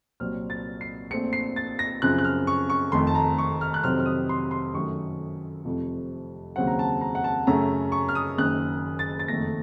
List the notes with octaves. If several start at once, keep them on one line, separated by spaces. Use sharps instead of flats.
C2 A#2 F#3 C4 F6
A6
C7
A#1 A#2 A3 C4 C#7
C7
A6
A#6
F#2 C#3 F3 C4 F#6
F#6
F6
C#6
C#6
F1 F2 D#3 A3 C6
A5
A#5
C#6
F6
F#6
F2 C3 D#3 F#3 C4 F6
F6
D#6
C6
C6
F#2 D#3 F#3 A3 C#6
F1 F2 C3 F3
D#2 C#3 F#3 C4 F#5
A#5
A5
A#5
F#5
A5
F#2 C#3 A3 C#4 A#5
C#6
F6
D#6
F#1 F#2 D#3 F#6
A6
A6
F#1 F2 D#3 A3 A#6